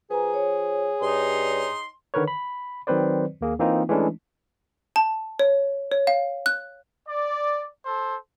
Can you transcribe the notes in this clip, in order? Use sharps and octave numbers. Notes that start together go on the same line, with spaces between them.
F3 G#4 B4 G#5 A#5
C#5
G2 D#4 C6
D3 D#3 A#4 B4 C#5
B5
D#3 F#3 C4 B4 C5 D5
D#2 A#3 G#4
E3 A#3 C4 D#4 F4
E3 G#3 A3 C#4 D4 E4
A5
C#5
C#5
F5
F#6
D5
A4 C5